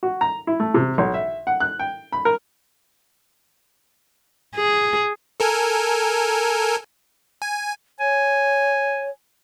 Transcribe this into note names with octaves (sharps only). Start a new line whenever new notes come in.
F#4
A#5
E4
A3
C3
B1
E5
F#5
F#6
G5
B5
A#4
G#4
A4 A#4 G#5
G#5
C#5 G#5